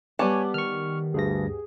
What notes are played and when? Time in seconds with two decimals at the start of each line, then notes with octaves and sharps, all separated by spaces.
0.19 G3 B3 C#5 G#5 A5 D6
0.54 D#3 C#6 F6
1.14 D2 G2 G#4 A#6